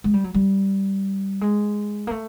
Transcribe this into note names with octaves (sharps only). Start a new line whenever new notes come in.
G#3
G3
F#3
G3
G#3
A#3
A3